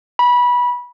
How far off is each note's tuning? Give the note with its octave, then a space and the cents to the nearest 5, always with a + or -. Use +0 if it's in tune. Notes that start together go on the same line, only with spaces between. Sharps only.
B5 -20